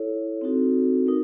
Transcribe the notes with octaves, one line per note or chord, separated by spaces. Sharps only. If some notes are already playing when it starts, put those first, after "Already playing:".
Already playing: E4 A4 C#5
C4 D#4 F#4 A4
D#4 A#4